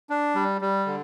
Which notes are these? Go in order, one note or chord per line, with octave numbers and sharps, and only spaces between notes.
D4
G3
G3
D3